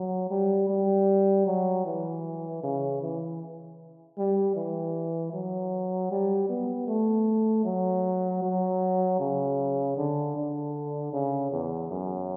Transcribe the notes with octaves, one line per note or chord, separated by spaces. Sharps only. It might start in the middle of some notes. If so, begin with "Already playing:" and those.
Already playing: F#3
G3
G3
F#3
E3
C#3
E3
G3
E3
F#3
G3
B3
A3
F#3
F#3
C#3
D3
D3
C#3
E2
F#2